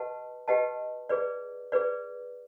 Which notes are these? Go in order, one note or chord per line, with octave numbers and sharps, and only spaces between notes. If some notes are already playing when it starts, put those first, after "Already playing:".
Already playing: G4 B4 D#5 F#5 A5
G4 B4 D#5 F#5 A5
G#4 B4 D5
G#4 B4 D5